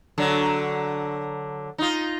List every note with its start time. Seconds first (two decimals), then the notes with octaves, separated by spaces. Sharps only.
0.18 D3 F#3
1.78 D#4 F4